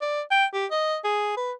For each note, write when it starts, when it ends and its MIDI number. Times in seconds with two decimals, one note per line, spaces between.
0.01 0.21 74
0.31 0.45 79
0.54 0.66 67
0.71 0.97 75
1.04 1.33 68
1.37 1.52 71